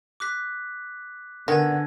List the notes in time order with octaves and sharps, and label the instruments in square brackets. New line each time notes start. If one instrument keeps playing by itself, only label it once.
[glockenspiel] D6 F#6 B6
[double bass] D3 [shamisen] D#3 [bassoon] B3 [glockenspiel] G#5 G#6 A#6